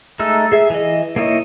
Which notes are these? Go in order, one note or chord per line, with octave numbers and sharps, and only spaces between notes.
G#3 A3 D#4 E6
G#4 E5
E3 D#5
A#3 D#4 E4 C#5 D#5